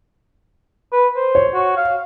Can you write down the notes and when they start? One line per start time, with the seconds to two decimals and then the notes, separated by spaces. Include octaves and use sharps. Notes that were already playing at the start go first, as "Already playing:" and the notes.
0.92 B4
1.16 C5
1.35 C#5
1.54 F#4
1.76 F5